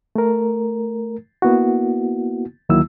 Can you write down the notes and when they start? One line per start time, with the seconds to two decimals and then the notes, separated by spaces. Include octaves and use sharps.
0.15 A3 A#4
1.42 A#3 B3 E4 F#4
2.69 D2 D#3 F#3 A#3 E4 E6